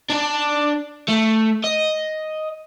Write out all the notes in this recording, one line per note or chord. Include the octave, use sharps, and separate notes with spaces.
D4 D5
A3
D#5